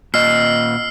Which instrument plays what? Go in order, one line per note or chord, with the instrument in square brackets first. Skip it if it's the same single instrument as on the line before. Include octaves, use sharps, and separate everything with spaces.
[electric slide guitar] A#2 D#5 [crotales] E6 F6 C7